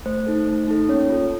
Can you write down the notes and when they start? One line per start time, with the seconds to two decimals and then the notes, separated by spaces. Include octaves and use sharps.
0.06 A3 C5
0.26 D#4 A4
0.47 A3
0.68 D#4 A4
0.89 A#3 C#4 C#5
1.10 F4 A4